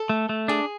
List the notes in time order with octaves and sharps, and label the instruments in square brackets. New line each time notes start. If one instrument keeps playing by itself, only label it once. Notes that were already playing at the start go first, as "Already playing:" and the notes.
Already playing: [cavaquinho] A4
[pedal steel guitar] A3
A3
[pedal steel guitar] D4 [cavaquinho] G#4